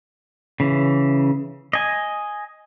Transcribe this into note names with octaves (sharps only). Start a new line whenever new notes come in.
C#3 E3
D#5 G#5